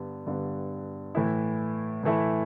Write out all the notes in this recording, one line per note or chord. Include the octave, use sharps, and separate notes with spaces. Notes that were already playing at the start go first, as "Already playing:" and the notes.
Already playing: G2 D3 G3 B3
G2 D3 G3 B3
A2 E3 A3 E4
A2 E3 A3 E4